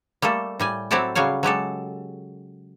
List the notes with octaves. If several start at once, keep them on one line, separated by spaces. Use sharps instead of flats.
G3 A3 A#3 A4
A2 G3 G#5
F#3 C4 E4 G4 A4 D5
C#3 F#3 G3 C#5 F5
F#3 G#3 G4 A4